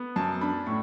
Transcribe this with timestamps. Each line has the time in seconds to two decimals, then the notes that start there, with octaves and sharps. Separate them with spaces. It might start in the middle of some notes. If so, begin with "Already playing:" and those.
Already playing: B3
0.16 F#2 A5
0.41 D4 B5
0.67 A2 C#6